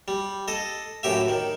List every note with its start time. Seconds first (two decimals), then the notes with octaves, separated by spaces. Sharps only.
0.08 G3
0.48 A4 D#5
1.03 F#2 A2 G4 E5
1.28 D#3